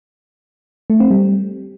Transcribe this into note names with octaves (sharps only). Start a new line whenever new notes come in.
A3
C4
G3